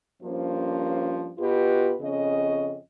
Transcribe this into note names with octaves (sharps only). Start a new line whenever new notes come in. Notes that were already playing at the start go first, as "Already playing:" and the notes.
G2 F3 A#3 C#4 C5
B2 F4 G4 B4
F2 C#3 C#4 D#5